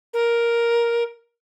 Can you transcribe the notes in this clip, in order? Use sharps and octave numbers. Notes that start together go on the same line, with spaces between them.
A#4